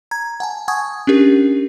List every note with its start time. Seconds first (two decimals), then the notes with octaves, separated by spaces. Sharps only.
0.11 A#5 G#6
0.40 F#5 G#5 A5
0.68 F#5 G#5 C#6 D#6 G#6
1.07 C#4 D4 G4 A#4